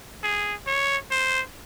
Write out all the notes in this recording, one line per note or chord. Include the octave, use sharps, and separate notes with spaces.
G#4
C#5
C5